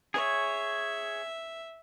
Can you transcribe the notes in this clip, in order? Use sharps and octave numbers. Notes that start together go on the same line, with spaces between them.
G#4 C#5 E5